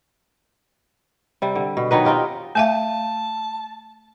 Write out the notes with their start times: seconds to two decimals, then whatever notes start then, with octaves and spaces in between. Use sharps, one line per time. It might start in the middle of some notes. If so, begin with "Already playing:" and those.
1.42 C3 G3
1.55 D3
1.77 B2
1.91 D#3 F#3 D#4 B4
2.05 C4 D#4 F4 G4
2.55 A3 E5 F5 A5